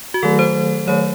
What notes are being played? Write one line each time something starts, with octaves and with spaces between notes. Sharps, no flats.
F#4
D#3 F#3 A3 A4
C5
D#3 F#3 A3 C#5